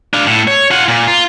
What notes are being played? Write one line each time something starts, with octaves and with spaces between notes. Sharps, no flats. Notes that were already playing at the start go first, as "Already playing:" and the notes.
D4 F5
A2
C#5
F4 F#5
A#2
F4